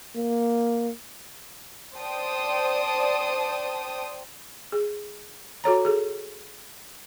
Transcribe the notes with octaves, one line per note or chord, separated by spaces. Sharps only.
A#3
C5 D5 G5 A5 D#6
G#4
F#4 A4 C#5 A#5
G#4 A4